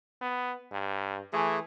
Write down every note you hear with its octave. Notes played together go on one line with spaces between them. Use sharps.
B3
G2
E3 A3 G#4